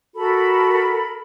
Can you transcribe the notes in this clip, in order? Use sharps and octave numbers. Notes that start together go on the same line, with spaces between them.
F#4 A4 A#4 B5